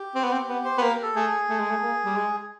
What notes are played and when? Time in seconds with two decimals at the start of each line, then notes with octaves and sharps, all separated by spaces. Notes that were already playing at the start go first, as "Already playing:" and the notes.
Already playing: G4
0.15 C4
0.24 B3
0.33 C4
0.49 B3
0.64 C5
0.78 B3 B4
0.82 A#3
0.90 A#4
1.02 A4
1.15 A3 G#4
1.49 A3
1.60 G#3
1.70 A3
1.83 A#3
2.05 G3
2.17 G#3